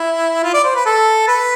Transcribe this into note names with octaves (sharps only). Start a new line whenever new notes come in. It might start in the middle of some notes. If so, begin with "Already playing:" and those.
Already playing: E4
F4
D5
C5
B4
A4
B4